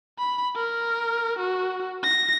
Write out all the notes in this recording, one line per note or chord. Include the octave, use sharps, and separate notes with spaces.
B5
A#4
F#4
A#6